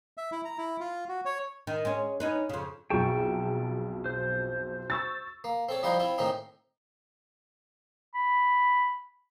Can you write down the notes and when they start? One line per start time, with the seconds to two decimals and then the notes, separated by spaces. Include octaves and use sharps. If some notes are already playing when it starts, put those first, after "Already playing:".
0.17 E5
0.32 E4
0.45 A#5
0.58 E4
0.80 F4
1.09 F#4
1.25 C#5
1.67 D#3
1.85 G#3 C#4
2.20 C#4 D#4 B4
2.49 F2 C#3
2.90 B1 F2 G#4 G5 A5 C#6
4.06 C5
4.90 C#6 E6 A6
5.44 A#3
5.69 C4 A4 C#5
5.83 F3 G3 D#4 E4 F#4 C5
5.99 C4 E4 F4
6.18 A2 D#3 C4 C#4 D#4
8.15 B5